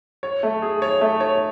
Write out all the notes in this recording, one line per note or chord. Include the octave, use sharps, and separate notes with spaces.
C#5
A3
G#4
C#5
A3
C#5